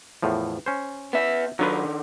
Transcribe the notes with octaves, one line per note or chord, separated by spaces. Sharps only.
E2 A2 F3
C#4 C5
B3 E5
D#3 F#3 D4 F4 B4